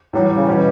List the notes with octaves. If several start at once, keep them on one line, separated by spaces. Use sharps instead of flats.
A2 E3 F#3 G3
C#3
B2 E3 G3 C#4